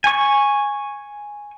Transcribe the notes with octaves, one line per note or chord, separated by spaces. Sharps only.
G#5 C#6